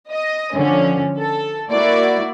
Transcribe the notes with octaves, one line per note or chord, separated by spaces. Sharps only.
D#5
D3 F3 C#4
A4
A#3 E4 F#4 D5